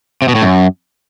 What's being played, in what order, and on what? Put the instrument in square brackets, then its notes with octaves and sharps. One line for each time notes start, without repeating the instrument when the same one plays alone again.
[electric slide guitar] C3
B2
A2
F#2